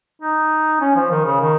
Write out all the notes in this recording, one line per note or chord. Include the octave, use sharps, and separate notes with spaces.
D#4
C#4
F3
D#3
C#3
D#3